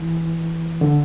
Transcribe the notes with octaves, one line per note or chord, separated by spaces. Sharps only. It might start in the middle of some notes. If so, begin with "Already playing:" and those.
Already playing: E3
D3